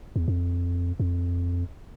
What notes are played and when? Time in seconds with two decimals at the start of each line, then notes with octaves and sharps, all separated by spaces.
0.16 E2
0.28 F2
1.00 F2